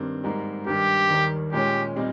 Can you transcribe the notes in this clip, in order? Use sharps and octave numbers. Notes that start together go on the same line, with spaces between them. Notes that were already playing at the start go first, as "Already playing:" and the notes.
Already playing: G2 D#3 G3 C4
G#2 G3 A#3 D#4
G2 D#3 G3 G4
D#2 D#3 G3 A#3
A#2 G#3 C#4 G4
A#2 G3 C4 D#4